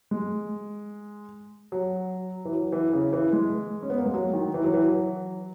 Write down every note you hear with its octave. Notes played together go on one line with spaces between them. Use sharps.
G#3
F#3
E3
F#3
E3
C#3
E3
G#3
C#4
B3
A#3
G#3
F#3
D#3
E3
F#3
E3
F#3